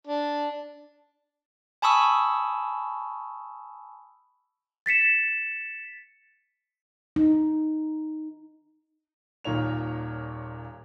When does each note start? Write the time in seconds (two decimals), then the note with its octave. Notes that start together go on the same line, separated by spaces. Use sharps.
0.07 D4
1.82 G#5 A5 B5 C#6 D#6 E6
4.86 A6 B6 C#7 E7
7.16 D#4
9.44 D#1 A#2 D#3 C#5 F7